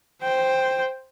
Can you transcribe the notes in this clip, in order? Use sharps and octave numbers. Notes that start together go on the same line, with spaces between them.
C5 G5